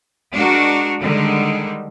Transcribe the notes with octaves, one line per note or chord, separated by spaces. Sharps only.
G#3 D4 F#4 A#4
D3 D#3 G3 G#3